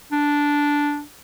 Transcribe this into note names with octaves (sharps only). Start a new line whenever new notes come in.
D4